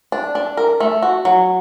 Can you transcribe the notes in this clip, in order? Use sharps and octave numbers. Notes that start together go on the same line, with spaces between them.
D4
D4
A#4
A3
F#4
F#3